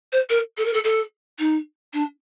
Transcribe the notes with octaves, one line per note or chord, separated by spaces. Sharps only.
C5
A#4
A4
A#4
A4
A4
D#4
D4